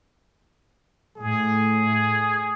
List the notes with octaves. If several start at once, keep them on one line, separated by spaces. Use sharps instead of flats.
A2 G#4